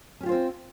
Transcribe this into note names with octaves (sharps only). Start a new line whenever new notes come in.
C4 C#4 F4 G4 C5